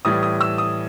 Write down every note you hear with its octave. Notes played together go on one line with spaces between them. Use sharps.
A2 E3 G3 D#6
D#6
E6
D#6